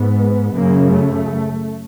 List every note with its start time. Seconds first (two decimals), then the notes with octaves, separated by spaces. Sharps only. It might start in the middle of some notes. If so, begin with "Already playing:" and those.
Already playing: G#2 B3
0.56 F#2 C#3 A#3
0.91 A3